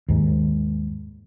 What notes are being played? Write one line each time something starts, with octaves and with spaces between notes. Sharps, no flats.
D#2 G#2